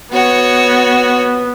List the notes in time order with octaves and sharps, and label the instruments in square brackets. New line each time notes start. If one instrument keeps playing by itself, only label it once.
[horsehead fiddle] B3 [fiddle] F#4 C#5